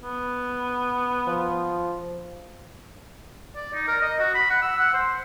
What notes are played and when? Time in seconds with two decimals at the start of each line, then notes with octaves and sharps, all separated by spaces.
0.03 B3
1.27 F3
3.55 D5
3.74 D#4
3.88 A#4
4.02 D#5
4.20 F#4
4.35 B5
4.50 F#5
4.62 E6
4.78 F#5
4.94 C5